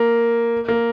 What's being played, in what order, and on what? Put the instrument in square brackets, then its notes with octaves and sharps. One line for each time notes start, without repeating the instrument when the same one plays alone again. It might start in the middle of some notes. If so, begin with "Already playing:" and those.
Already playing: [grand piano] A#3
A#3